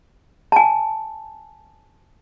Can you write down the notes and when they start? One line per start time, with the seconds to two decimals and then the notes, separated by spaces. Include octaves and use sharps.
0.52 G#5 A5